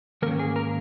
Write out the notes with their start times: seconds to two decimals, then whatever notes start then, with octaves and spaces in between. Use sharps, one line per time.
0.22 G#2 D#3 A#3 C#4 A#4
0.39 G#4
0.56 A#4